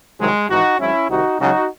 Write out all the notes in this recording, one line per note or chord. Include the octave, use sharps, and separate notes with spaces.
C2 C3 D#3 F#3 G#3
G#1 G#2 E3 D#4 F#4
G#1 G#2 F#3 C#4 E4
C2 C3 D#3 D#4 F#4
C#2 C#3 F#3 D#4 F#4